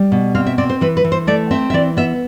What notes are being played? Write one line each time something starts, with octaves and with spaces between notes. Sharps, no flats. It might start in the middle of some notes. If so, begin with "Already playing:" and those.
Already playing: G3
B2
C4 F5
E5
C4 D5
C5
E3 B4
B4
E3
C5
A3 D5
C4 E5
E5
E3 D5
B3 E5